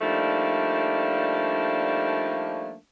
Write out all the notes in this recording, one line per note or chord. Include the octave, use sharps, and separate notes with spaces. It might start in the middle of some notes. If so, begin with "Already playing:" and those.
F3 G3 A3 A#3 D4 D#4